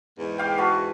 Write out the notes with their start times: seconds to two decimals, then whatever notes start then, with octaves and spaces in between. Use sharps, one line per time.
0.18 E2 G#2
0.38 G4 F5 G5
0.58 F#4 B4 A5